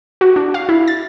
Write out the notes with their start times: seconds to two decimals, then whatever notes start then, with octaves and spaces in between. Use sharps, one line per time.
0.21 F#4
0.36 D4
0.54 F5
0.69 E4
0.88 A6